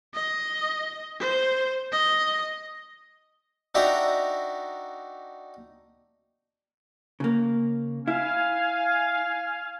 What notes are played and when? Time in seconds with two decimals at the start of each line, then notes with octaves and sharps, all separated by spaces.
0.14 D#5
1.20 C5
1.92 D#5
3.75 D4 D#4 F#4 E5 G5 A#5
7.20 C#3 A#3
8.08 E4 F5 G#5